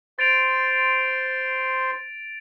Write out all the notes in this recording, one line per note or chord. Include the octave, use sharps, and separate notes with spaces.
C5 C6 A6 D7 F7